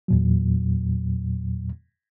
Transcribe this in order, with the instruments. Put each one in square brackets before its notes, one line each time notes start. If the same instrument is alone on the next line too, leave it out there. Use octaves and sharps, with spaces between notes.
[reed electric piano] E2 A#2 F#3